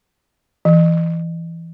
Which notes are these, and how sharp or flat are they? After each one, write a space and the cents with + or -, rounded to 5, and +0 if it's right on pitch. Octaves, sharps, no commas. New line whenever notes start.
E3 +10